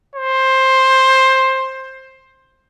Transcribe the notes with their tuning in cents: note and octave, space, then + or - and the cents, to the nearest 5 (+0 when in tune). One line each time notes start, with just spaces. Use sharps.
C5 +15